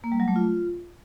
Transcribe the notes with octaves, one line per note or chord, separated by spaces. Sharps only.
A#3
G3
F#3
A3
F4